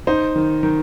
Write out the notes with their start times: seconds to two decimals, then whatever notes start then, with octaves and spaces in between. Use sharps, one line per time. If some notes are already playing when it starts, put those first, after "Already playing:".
0.07 D#4 C5
0.36 D#3
0.63 D#3